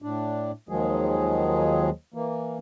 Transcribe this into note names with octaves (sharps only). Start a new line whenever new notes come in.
A2 D4
D#2 D#3 F3 F#3 G#3 G#4
E3 A#3